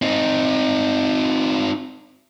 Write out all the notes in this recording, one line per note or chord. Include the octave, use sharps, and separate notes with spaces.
C4 D#4